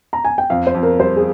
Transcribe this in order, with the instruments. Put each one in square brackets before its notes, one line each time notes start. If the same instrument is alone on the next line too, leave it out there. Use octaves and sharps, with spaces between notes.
[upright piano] A#5
G#5
G5
[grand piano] F2 [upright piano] F5
[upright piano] C5
[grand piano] F2
[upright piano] A#4
[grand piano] G3 [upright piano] C5
[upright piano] G#4